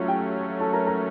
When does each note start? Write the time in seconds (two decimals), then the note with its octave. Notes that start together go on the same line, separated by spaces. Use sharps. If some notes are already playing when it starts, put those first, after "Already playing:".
Already playing: F#3 A3 C#4 F4
0.08 G4 G5
0.60 A4 A5
0.73 A#4 A#5
0.87 A#4 A#5